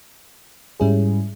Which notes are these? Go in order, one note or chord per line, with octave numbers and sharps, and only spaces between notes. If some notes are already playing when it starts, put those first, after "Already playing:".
G#2 G3 C#4 E4 G#4